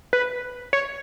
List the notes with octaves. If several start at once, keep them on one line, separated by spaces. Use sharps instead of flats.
B4
C#5